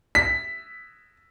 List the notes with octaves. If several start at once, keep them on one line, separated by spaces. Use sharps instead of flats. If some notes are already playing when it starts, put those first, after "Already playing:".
B6